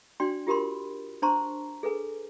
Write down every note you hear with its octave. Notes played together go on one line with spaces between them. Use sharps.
D4 F#4 D5 G5 C6
F4 G4 A#4 B5 C6
D4 C5 A5 A#5 C6 C#6
G#4 A4 B4 G#5